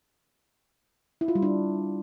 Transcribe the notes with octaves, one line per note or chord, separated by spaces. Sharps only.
E4
F4
G3
D4